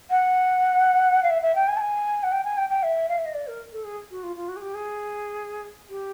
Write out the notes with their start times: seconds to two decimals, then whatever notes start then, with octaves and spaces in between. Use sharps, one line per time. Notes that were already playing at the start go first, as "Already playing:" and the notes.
0.10 F#5
1.23 F5
1.30 E5
1.42 E5
1.55 G5
1.68 G#5
1.76 A5
1.80 G#5
2.23 F#5
2.32 G5
2.44 G#5
2.57 G5
2.69 G5
2.83 E5
3.09 F5
3.17 E5
3.25 D#5
3.34 D5
3.47 A#4
3.72 A4
3.84 G#4
4.10 F#4
4.23 F4
4.36 F4
4.48 F#4
4.56 G#4
4.61 G4
4.74 G#4
5.89 G4